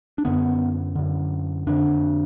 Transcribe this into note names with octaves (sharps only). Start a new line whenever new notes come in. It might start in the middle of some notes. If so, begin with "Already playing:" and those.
D4
F#2 D3 B3
F#2 D3
F2 D3 D4